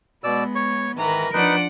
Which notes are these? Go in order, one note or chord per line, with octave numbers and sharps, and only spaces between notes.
B2 G#3 B3 D5 E6
C#5 C#6
G#2 D#3 E3 A#4 B4 A#5
F3 D4 D#4 B4 F#5 D7